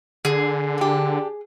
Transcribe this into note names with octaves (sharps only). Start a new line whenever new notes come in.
D3 G#4
D4 G4